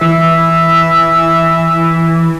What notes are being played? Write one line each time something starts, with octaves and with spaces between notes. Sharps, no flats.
E3 E5